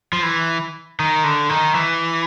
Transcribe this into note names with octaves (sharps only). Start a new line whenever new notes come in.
F3
E3
D#3
D3
D#3
E3